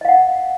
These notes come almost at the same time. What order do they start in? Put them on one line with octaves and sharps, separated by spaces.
D#5 F5 F#5